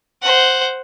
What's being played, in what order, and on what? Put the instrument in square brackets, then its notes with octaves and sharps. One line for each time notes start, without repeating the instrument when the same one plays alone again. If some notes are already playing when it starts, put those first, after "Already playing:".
[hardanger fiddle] C5 F#5